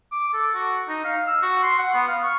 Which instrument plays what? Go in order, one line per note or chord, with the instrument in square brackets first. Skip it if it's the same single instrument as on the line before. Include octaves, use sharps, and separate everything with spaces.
[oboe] D6
A4
F#4
D#4
F5
E6
F#4
C6
F#5
B3
F5
C#6